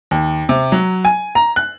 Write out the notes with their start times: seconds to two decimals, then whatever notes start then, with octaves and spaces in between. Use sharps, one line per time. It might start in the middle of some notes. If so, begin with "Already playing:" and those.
0.11 D#2
0.49 C3
0.72 F#3
1.05 G#5
1.35 A#5
1.56 F#6